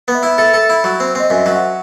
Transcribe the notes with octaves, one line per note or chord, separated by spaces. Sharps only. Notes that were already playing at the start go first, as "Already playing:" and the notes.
B3
E5
E4
A4 E5
A4
E4
F#3
C4
C4 D#5
F#2 E5
F#3
F#5